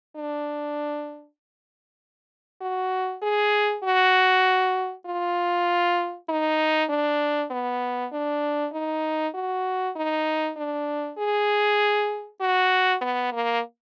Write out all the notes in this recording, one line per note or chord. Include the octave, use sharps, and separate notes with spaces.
D4
F#4
G#4
F#4
F4
D#4
D4
B3
D4
D#4
F#4
D#4
D4
G#4
F#4
B3
A#3